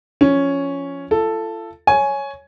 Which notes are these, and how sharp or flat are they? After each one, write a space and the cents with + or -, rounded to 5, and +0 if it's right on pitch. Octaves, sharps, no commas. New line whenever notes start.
F3 -10 C#4 +0
F4 -40 A4 +5
C#5 +0 G#5 +10